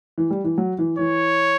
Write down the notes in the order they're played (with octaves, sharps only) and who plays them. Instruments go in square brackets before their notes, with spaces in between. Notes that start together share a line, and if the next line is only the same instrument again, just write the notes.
[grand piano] E3
G3
E3
F#3
E3
[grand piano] E3 [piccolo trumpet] C#5